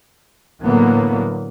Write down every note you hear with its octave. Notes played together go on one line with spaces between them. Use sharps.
A2 D3 E3 F#3 A#3 B3